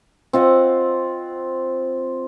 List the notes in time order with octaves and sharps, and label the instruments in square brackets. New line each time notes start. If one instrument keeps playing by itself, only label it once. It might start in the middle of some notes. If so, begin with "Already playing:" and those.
[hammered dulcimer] C4 F4 D#5 F#5